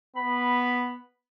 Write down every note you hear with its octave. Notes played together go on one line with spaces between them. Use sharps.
B3 B5